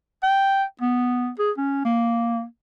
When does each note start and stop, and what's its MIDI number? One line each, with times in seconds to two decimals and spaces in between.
0.23 0.63 79
0.81 1.29 59
1.39 1.51 68
1.58 1.81 61
1.85 2.44 58